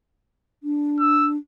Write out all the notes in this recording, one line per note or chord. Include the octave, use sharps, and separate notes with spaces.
D4
E6